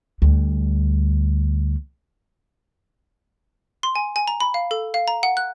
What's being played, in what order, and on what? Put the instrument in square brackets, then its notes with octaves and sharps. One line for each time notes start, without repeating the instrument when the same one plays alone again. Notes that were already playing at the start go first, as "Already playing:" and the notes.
[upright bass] D2 G3
[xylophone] C6
G#5
G#5
A#5
B5
F5
A4
F5
A#5
F#5
F#6